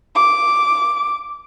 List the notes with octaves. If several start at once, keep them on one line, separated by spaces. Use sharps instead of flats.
D6